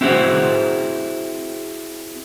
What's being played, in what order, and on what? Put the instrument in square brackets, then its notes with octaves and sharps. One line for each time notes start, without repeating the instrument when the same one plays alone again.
[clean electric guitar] C4 E4 F#4 G#4 C5